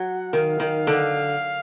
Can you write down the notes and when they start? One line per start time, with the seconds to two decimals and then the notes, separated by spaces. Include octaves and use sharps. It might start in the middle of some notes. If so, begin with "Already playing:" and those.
Already playing: F#3 F#5
0.33 D#3 F5
0.60 D#3
0.87 D3